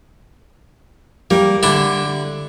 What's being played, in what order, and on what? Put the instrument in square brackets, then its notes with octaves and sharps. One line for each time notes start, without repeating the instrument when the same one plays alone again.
[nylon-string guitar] G3 [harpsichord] A#3
[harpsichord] D3 D4 E4